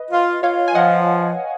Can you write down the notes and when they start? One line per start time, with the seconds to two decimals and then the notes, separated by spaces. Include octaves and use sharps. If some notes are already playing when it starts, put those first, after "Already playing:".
Already playing: B4 D#5
0.11 F4
0.43 F4 C#5 F5
0.68 G#5
0.75 F3 D#5 F#5